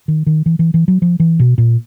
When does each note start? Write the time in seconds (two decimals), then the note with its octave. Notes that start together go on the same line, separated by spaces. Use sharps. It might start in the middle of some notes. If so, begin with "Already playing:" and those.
0.08 D#3
0.26 D#3
0.46 E3
0.59 E3
0.74 E3
0.88 F#3
1.02 F3
1.20 E3
1.40 B2
1.58 A#2